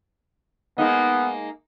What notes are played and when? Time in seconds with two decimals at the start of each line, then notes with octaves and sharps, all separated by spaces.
0.78 G#3 A#3 B3 D#4